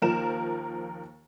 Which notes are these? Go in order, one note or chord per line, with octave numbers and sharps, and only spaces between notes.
D#2 F3 A#4 E7